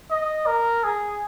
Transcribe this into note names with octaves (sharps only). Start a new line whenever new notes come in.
D#5
A#4
G#4